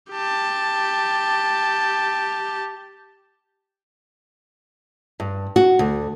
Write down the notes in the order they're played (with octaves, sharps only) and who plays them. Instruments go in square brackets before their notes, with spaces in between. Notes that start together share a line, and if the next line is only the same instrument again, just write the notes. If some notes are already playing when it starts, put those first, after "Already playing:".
[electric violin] G4 A5
[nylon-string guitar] G2
F#4
D2